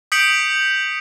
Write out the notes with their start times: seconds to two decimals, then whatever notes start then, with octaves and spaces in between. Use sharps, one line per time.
0.12 D#6 G6 B6 C#7 D7 F#7